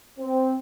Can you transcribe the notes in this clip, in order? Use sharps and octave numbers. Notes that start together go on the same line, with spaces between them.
C4